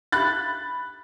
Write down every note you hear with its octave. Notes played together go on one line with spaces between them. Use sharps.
B5 F#6 A6